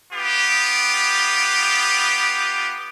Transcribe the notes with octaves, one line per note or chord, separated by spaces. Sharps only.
B3 F4 G4